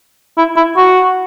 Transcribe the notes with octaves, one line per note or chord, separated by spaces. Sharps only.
E4
E4
F#4